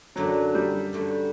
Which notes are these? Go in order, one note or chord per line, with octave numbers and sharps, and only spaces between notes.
F#2 D3 F#3 A3 D4
G3
G2 D3 F#3 A3